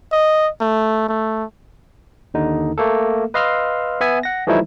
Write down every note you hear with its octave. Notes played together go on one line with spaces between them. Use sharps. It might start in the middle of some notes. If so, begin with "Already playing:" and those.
D#5
A3
A3
D#2 D3 D#4
A3 A#3 A4
B4 D#5 F5 C6 E6 F6
B3 E5 G#5
F#5 A#6
E3 F3 G3 A3 D#4 E4